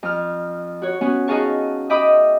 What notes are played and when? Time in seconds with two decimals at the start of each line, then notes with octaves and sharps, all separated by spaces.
0.03 F2 F6
0.82 F#4 C#5
1.01 B3 C#4 F#4
1.28 D#4 F#4 G#4 F5 A5 C#6
1.90 D#5 E5 G5 B5 D6 D#6